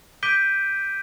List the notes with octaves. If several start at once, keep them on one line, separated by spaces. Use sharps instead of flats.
D6 G6 B6 D7 D#7 G7